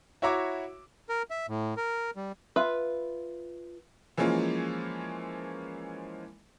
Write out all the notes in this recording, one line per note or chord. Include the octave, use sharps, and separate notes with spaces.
E4 F#4 C#5 E5 A#5 D6
A#4
E5
A2
A#4
G3
F4 B4 E5
E3 F3 G#3 A#3 C#4 F4